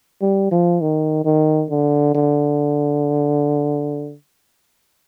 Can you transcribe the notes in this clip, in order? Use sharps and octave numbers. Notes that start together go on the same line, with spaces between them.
G3
F3
D#3
D#3
D3
D3